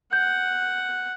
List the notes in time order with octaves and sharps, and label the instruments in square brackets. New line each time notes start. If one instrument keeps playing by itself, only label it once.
[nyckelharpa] F#5 [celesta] G6